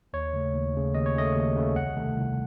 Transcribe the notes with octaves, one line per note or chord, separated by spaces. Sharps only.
D#2 C#5
C#3 A3
D#2
C#3 A3
D#2 D#5
C#5
C#3 A3 D#5
D#2
C#3 A3
C2 F#5
C3 D#3 A3
C2